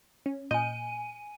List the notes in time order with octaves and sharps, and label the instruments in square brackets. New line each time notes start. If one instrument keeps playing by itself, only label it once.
[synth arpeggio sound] C#4
[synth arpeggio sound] A#2 D#5 G6 [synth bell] G#5 D#7